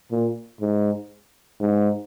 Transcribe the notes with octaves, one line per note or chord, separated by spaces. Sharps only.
A#2
G#2
G#2